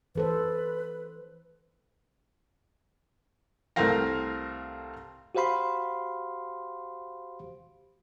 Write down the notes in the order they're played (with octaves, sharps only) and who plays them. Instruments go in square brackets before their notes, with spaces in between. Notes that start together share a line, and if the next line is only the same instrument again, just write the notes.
[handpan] E3 A4 C5 [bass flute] B4
[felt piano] C2 A3 C4 A#4 F5 A#6
[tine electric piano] F#4 G4 C5 F5 B5 C6